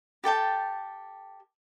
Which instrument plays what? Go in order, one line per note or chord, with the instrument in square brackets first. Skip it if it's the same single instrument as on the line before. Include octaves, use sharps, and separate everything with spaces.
[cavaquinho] G4 A4 G5 A5